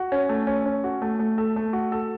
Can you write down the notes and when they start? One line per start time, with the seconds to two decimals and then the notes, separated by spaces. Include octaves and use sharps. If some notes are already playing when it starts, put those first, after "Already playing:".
Already playing: F#4
0.12 C#4
0.29 A3
0.47 C#4
0.66 C#4
0.84 F#4
1.02 A3
1.19 A3
1.38 A4
1.56 A3
1.73 F#4
1.92 A4